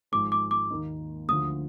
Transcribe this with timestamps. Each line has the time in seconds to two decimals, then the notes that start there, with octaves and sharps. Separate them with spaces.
0.12 G#1 G#2 F3 G#3 D6
0.32 D6
0.51 D6
0.70 D#2 D#3 A#3 D#4
1.29 D2 D3 F3 D#6